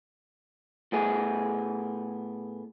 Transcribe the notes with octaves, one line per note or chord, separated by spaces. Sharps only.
A2 B3 G#4